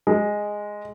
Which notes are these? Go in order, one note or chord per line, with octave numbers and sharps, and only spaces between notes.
G#3